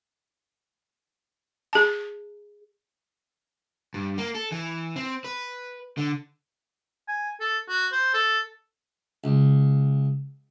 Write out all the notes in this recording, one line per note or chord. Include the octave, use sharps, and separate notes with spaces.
G#4 A5
G2
A#3
A4
E3
C4
B4
D3
G#5
A4
F#4
C5
A4
C#2